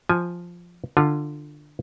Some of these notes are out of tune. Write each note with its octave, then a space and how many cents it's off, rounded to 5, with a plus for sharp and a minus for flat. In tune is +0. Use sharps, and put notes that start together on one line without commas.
F3 +0 G#5 +0
D3 +15 F4 +0